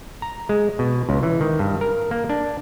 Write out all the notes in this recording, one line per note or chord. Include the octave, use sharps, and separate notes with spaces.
A#5
G#3
B2
C#2
E3
D#3
G2
A#4
A#3
D4